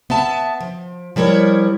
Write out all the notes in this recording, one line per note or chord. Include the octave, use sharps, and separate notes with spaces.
B3 E5 A5
F3
F3 G3 E4 A#4 C#5